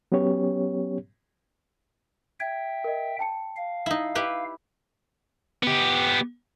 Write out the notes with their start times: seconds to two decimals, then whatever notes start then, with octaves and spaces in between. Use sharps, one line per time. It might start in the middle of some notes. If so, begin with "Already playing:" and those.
0.12 F#3 B3 C#4 G4 C#5
2.40 E5 G5 G#6
2.84 A#4 D#5
3.19 G5 A5 C#7
3.56 F5
3.86 D#4 E4
4.15 E4 G4 B4
5.63 B3 G4